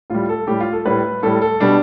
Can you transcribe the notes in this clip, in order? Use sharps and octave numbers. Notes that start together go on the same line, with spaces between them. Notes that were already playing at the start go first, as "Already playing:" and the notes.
A2 G3 F4
A4
A2 G3 G4
F4
A4
A2 G3 B4
A2 G3 A4
A4
B2 G3 D4